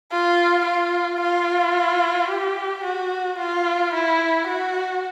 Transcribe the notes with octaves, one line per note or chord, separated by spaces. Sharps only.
F4
F4
F4
G4
F#4
F4
E4
F#4